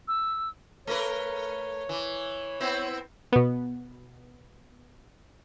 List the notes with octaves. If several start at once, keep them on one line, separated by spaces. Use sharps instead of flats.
E6
A3 A#4 B4 C#5
E3
B3 C4 E4
B2 B3